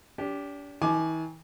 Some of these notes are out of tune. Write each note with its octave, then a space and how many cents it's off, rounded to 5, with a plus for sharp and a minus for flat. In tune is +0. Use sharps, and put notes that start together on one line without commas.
D4 -40 G4 +0
E3 -40 G#5 +35 D6 +10